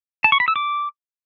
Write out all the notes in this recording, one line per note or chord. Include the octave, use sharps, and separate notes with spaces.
A5
C#6
B5
E6
D6